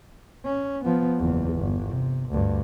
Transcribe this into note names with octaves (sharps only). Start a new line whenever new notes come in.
C#4
F3 B3
F#1 E2
G1
C3
D2 G2